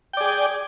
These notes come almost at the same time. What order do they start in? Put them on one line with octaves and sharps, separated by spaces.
G5 D5 G#4